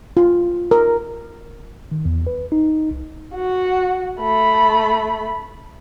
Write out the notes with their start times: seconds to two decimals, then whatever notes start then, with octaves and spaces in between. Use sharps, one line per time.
0.17 F4
0.71 A#4
1.91 D#3
2.05 E2
2.27 B4
2.52 D#4
2.91 C2
3.35 F#4
4.21 A3 B5